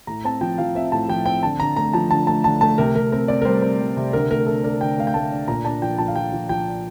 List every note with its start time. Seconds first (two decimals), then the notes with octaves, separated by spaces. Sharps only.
0.07 A2 A#5
0.24 C4 A5
0.41 F3 G5
0.58 F3 F5
0.75 C4 E5
0.92 A2 A5
1.09 F3 G5
1.26 C4 G5
1.43 D3 A5
1.59 D3 A#5
1.76 A3 A#5
1.93 F3 A5
2.11 D3 A5
2.27 A3 A5
2.44 D3 A5
2.61 A3 A5
2.78 C3 A#4
2.95 C3 A#4
3.12 C4 A#4
3.28 C4 D5
3.42 A#4
3.45 G3 C5
3.62 C4
3.80 G3
3.97 C3
4.13 D3 A#4
4.30 A3 A#4
4.46 D3 A4
4.64 D4 A#4
4.80 D3 G5
4.98 A3 F5
5.07 G5
5.14 A3 A5
5.32 D4
5.48 A#2 A#5
5.65 D4 A5
5.82 F3 G5
5.98 F3 A5
6.08 F5
6.16 F3 G5
6.33 F3
6.49 F3 G5
6.66 D4